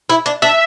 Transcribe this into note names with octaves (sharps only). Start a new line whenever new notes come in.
E4
D4
D4 E5